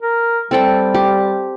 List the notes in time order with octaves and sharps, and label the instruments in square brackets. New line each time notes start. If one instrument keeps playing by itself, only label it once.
[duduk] A#4
[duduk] G3 [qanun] C4 A4 G5
[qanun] G4